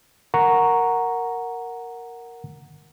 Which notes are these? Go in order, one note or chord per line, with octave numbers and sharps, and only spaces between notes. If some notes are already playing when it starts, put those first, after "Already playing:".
A#4 F#5 A#5 C#6